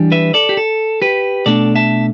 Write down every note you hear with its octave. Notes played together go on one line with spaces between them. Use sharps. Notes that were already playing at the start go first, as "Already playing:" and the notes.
Already playing: E3 G3 D4
B4 E5
A4 D5
G4
A4
G4 B4
B2 A3 D4 A4 D5
E5 A5